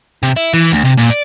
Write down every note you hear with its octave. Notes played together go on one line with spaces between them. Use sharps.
C3
E4
E3
D2
C3
A#2
D5